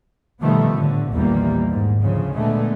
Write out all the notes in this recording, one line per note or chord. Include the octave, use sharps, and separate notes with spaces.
B2 D#3 F3 G3 A3 B3
A2 D3
A#1 E2 D#3 G3 A#3
G#2
D2 C#3 F3
A#2 D3 G#3 A3 B3